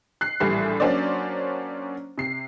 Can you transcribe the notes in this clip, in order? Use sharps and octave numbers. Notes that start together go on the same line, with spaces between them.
F#6 C7
A#1 A2 E3 G3 C7
F#3 A#3 C#4 D4 C5 D5
C3 C7